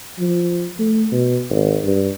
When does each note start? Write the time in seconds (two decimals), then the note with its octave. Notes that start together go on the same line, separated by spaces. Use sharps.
0.19 F3
0.79 A3
1.12 B2
1.50 G#1
1.83 G2